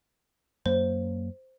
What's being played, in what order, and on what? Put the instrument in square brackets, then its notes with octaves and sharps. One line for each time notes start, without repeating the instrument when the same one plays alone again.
[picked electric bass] F#2 F#3 A#3 [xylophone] C5